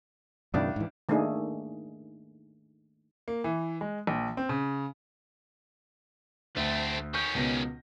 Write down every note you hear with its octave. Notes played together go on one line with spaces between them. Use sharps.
C#2 F#2 B2 D#3 D4 E4
G#2 E3
D#3 A3 A#3 D4 D#4 G#4
A#3
E3
G#3
A#1
C4
C#3
D2 A3 C4
D#3 C#4 C#6 G6
C#2 B2 A#6